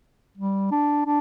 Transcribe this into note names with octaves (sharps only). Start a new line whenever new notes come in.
G3
D4
D4